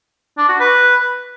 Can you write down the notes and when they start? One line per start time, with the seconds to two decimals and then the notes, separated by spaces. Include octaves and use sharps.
0.38 D4
0.49 F#4
0.60 B4